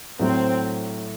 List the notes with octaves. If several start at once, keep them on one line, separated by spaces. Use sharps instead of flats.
A2 F#3 A3 C4